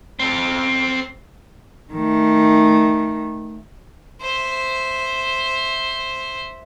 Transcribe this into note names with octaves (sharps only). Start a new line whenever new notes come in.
C4 A4
D#3 A3
C5 E5